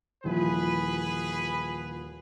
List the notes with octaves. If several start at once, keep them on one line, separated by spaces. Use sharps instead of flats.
D#1 E3 F3 G#4 B4 B5